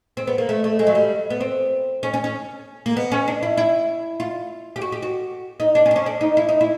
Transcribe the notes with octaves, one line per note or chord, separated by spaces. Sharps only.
C4
B3
A#3
A3
A3
G#3
F#3
G3
B3
C4
C#4
C#4
C#4
A#3
B3
C#4
D4
E4
E4
F4
G4
F#4
G4
F#4
D#4
D4
C#4
D4
C#4
D4
D#4
E4
D#4
E4